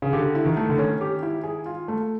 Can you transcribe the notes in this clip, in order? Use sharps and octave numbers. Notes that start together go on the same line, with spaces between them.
C#3
D3 G4
E4
D#3
A3
D3
D#3 C#4
G4
E4
G#4
F4
A3